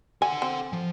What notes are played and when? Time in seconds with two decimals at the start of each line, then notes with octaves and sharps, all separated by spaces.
0.22 A4 F#5 G#5
0.42 C4
0.73 F3